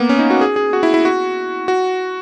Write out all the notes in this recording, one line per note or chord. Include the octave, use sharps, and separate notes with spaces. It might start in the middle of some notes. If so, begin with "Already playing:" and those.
Already playing: A#3 B3
C#4
D#4
F#4
G#4
G#4
F#4
E4
E4
F#4
F#4